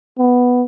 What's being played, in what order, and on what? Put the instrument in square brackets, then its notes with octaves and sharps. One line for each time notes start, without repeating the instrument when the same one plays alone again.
[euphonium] B3